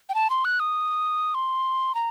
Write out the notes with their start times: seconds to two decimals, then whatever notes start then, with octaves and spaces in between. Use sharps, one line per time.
0.09 G5
0.15 A5
0.30 C6
0.45 F#6
0.60 D#6
1.35 C6
1.95 A#5